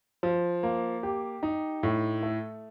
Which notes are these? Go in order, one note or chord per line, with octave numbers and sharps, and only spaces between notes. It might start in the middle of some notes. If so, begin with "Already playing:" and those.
F3
A#3
G4
D#4
A2
A3